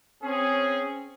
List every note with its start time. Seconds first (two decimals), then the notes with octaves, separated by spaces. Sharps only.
0.23 C4 C#4 G#4